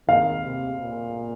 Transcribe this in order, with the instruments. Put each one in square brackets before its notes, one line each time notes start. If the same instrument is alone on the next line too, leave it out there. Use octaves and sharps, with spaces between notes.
[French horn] D#3 [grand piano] F5
[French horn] C3
A#2